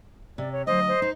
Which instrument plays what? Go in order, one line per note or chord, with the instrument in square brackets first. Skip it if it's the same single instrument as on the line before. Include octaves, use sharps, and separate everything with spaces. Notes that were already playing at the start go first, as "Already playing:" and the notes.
[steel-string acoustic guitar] C3 [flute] D5
[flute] C#5
[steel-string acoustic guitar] D2 F#3 [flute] C5 [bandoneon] D#5
[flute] C5
[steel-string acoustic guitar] D#4